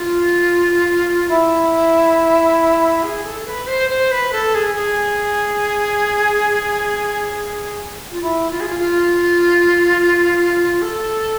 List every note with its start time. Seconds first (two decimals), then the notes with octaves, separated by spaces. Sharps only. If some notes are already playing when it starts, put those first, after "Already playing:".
Already playing: F4
1.29 E4
3.03 G#4
3.24 A4
3.46 B4
3.67 C5
3.90 C5
4.11 B4
4.32 A4
4.55 G#4
4.76 G#4
8.11 F4
8.22 E4
8.50 F4
8.60 G#4
8.68 F4
8.79 F4
10.82 A4